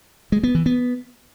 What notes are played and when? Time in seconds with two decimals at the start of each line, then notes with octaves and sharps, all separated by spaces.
0.32 G#3
0.43 B3
0.55 E3
0.66 B3